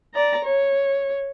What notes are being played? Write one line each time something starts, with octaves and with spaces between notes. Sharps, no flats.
D5 A#5
C#5